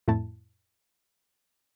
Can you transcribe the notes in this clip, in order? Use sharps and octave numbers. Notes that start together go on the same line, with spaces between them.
F2 A2 A3 E4 A5